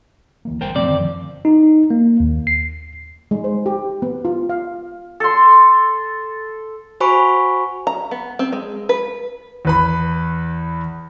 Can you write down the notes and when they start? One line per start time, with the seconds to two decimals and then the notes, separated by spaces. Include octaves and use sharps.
0.45 D2 E3 A#3
0.61 G1 A#4 C5 G5
0.76 F2 B2 A3 C4 D5
0.89 F#2 D3 D#3
1.45 D#4
1.90 A#3
2.20 D#2
2.47 C7
3.31 G#3
3.44 C5
3.66 G4
4.02 B3
4.25 F4
4.49 F5
5.20 A4 C6
7.00 F#4 C5 G#5 B5 C#6
7.87 A#5
8.11 B3
8.39 C4
8.52 G#3
8.89 B4
9.65 E2 B4 B5